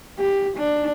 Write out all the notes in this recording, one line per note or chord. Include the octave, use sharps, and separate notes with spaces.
G4
D4